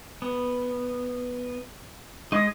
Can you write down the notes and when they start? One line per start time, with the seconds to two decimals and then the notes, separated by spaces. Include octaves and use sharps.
0.22 B3
2.32 G#3 D#4 D#6